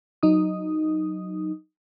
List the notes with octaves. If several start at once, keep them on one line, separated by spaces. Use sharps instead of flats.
F#3 D#4 D#6